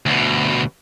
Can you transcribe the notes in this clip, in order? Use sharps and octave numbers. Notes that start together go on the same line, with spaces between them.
D2 B2